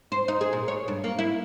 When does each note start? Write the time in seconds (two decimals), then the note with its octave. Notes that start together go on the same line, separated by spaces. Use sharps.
0.12 C5
0.28 D#4
0.41 G#4
0.53 A#2
0.68 C#5
0.88 G2
1.04 A#3
1.19 E4